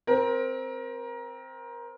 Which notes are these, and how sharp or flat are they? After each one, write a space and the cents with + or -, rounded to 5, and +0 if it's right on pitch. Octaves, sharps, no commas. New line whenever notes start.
C4 +0 A#4 +20